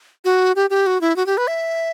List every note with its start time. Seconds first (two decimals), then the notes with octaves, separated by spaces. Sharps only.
0.25 F#4
0.56 G4
0.70 G4
0.87 F#4
1.01 E4
1.16 F#4
1.26 G4
1.37 B4
1.47 E5